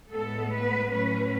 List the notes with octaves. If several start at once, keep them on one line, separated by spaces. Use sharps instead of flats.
A2 G#3 B3 A4
B4
A2 F#3 C#4 B4